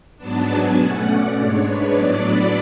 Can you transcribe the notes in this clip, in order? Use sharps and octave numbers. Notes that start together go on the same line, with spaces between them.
G#2 F#3 B3 D4 A5
G#5
B2 A3 C#4 F#5
D5
G#2 G#3 D4 C#5
B4
A2 F#3 B3 D4 D5
B5